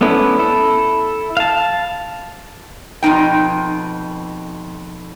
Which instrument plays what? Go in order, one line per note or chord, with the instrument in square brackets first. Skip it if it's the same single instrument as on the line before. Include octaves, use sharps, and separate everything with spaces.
[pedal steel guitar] A3 B3 C#4 D4 E4
E4 A4
F5 A5
[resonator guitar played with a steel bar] F2 B2 D#4 G5